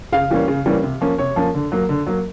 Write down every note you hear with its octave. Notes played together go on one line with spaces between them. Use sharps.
C#3 F5
E3 G3 A#3 C#4
C#3
E3 G3 A#3 C#4
C3
F3 A#3 C#4
C3 C#5
F3 A#3 C#4
D3
F#3 A#3
D3
F#3 A#3